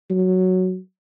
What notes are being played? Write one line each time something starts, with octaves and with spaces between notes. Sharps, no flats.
F#3